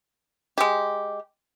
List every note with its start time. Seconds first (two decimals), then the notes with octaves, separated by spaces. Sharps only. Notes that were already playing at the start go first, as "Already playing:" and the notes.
0.58 G#3 G4